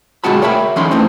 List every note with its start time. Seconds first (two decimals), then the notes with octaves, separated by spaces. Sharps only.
0.24 B2 D3 G#3 F#4 A5 B5
0.42 A#4 C#5 E5 G5 B5
0.76 D3 E3 C#4 D#4 B5 C6
0.91 F2 E3 A3 C4 D#4